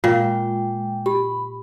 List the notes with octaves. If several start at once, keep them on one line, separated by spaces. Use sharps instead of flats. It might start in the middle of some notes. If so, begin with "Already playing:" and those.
A#2 G#3 F4 G5
G4 B5